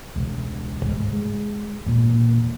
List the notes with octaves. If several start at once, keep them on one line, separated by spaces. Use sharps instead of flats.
E1 C#2
C#2 G#2
G#3
E1 A#2